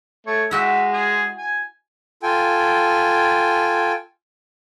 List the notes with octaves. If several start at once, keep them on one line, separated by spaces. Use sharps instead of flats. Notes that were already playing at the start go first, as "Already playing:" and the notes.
A3 C#5
G#3 E4 F#4 E5 G5
G#4
G#5
F4 A4 G5 G#5